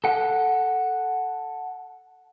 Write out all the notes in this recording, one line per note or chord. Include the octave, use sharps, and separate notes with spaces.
A4 F#5